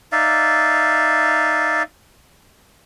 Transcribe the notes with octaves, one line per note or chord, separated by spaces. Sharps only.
D#4 D5 E5 F5